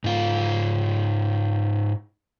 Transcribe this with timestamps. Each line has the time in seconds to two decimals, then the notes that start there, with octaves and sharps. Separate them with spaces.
0.04 G#2 F4